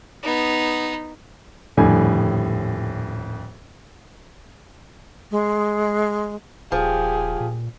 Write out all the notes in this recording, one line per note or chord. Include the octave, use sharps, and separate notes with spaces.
B3 D#4
D#1 F2 A2 D3 G3 G#5
G#3
D#1 F3 G4 G#4
A#2